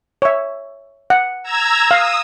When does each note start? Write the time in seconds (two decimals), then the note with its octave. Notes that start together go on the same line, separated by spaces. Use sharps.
0.22 C#5 E5
1.10 F#5
1.43 A#5 E6 G#6
1.91 F5 D#6 E6